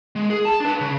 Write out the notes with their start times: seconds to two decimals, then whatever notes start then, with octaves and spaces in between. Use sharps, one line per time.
0.16 G#3
0.30 G#4
0.45 A5
0.60 D4 B4
0.81 C#3